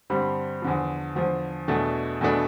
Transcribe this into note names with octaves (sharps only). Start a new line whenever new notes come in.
G2 D3 G3 C4
E2 D3 F3
E2 D3 F3
E2 B2 A3 D4
E2 B2 A3 D4